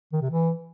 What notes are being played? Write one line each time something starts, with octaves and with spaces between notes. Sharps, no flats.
D#3
C3
E3